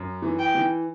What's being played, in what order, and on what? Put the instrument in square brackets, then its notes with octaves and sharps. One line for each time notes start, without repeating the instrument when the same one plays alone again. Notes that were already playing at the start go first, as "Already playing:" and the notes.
Already playing: [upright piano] F#2
E3
[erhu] G5
[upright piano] E3